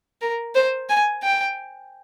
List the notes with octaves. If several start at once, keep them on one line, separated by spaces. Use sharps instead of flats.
A#4
C5
G#5
G5